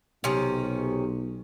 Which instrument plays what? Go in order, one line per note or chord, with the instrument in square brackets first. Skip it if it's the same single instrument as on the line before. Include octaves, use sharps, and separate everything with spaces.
[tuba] B1 [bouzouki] C3 D#3 C#4